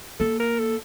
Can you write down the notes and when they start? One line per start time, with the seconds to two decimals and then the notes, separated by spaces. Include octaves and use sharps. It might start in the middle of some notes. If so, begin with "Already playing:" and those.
0.20 A#3 A4
0.39 A#4
0.59 A4